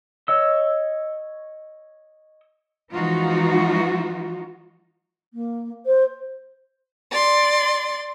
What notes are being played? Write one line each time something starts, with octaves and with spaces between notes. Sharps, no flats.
C#5 D#5 E6
E3 F3 G#3 D#4 F4 F#4
A#3
C5
D5 C6